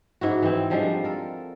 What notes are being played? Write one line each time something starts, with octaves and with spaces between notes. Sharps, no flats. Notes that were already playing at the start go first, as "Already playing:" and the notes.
G#2 E4 F#4
E3 C4
D3 F3 G3 G#3
A4 A#4